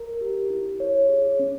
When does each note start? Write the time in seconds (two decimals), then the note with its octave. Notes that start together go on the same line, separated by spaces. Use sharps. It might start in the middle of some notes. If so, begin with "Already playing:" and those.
Already playing: A#4
0.21 G4
0.50 E4
0.80 C#5
1.09 G#4
1.39 C#4